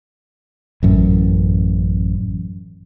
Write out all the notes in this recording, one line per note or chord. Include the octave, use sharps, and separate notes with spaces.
A1 F#2